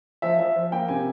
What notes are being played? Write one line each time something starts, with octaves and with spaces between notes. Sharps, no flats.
F3 E5
F3 E5
F3
A#3 G5
C3 G#5